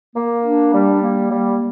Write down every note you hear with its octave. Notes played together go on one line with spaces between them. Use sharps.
A#3
D4
G3
A#3
G3